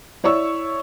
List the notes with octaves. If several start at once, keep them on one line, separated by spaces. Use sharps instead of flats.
E4 C#5 D5 C#6 E6